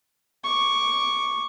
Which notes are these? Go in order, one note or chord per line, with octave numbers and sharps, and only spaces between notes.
C#6 D6